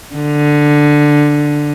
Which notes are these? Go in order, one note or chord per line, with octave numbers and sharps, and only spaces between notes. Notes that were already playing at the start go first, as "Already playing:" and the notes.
D3